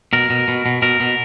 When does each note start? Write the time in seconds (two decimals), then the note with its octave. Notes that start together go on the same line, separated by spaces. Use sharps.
0.13 B2 A#4
0.30 B2
0.48 B2
0.66 B2
0.82 B2 A#4
1.00 B2